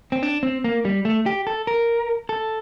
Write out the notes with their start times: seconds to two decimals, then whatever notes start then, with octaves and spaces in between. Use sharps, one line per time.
0.12 C4
0.23 D4
0.43 C4
0.64 A#3
0.85 G3
1.05 A3
1.26 G4
1.47 A4
1.67 A#4
2.29 A4